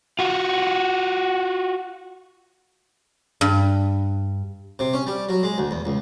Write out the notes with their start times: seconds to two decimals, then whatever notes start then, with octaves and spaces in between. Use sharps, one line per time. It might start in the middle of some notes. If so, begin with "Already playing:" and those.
0.19 F4 F#4
3.41 G2
4.79 C3
4.94 C#4
5.07 G3
5.29 F#3
5.43 G#3
5.58 D2
5.71 E2
5.85 C#2